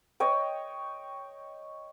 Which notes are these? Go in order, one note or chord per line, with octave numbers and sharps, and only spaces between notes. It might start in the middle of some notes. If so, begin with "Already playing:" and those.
C#5 D#5 G5